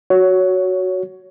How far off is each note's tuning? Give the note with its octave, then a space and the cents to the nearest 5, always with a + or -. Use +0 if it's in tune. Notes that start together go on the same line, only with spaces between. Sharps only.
F#4 +0 C#5 +15